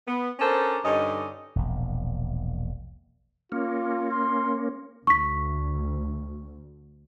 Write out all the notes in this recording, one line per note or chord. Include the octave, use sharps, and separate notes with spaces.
B3
C#4 D4 A4 A#4 C5
G2 D3 C#4 D#4 D#5
E1 A#1
A#3 C#4 F4
C6
D2 C#6 B6